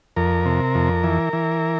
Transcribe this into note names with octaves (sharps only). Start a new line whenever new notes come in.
F2 A#4
C3
F2
E3
E3